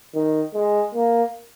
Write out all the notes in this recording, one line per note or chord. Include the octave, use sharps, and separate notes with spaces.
D#3
G#3
A#3